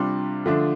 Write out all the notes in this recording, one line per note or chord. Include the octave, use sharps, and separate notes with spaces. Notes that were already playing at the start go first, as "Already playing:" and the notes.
Already playing: C3 G3 D4 F4 C6
D3 F3 A3 D4